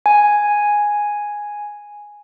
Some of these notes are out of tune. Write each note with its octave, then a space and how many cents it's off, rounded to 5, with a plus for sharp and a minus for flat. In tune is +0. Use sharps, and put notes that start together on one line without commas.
G#5 +0